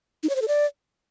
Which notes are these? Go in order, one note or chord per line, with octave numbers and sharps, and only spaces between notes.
D#4
C#5
C5
A4
D5